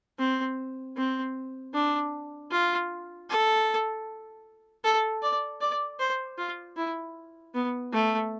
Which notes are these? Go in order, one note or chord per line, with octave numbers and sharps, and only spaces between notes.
C4
C4
D4
F4
A4
A4
D5
D5
C5
F4
E4
B3
A3